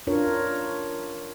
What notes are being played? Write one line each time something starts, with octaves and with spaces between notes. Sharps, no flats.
D4 F4 A#4 C#5